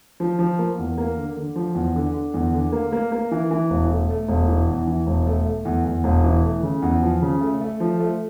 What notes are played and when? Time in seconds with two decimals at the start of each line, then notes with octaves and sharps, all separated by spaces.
0.20 F3
0.39 F3
0.59 A#3
0.78 E2
0.98 A#3
1.17 D3
1.37 D3
1.56 F3
1.75 E2
1.95 D3
2.14 D3
2.34 E2
2.54 D3
2.72 A#3
2.92 A#3
3.12 A#3
3.31 E3
3.51 E3
3.70 E1
3.90 A3
4.10 A3
4.28 E1
4.48 E3
4.67 E2
4.87 E3
5.07 E1
5.26 A3
5.46 A3
5.65 E2
5.85 E2
6.04 E1
6.24 E3
6.43 A3
6.63 C#3
6.82 E2
7.02 F3
7.22 C#3
7.41 A3
7.61 A3
7.80 F3
8.00 A3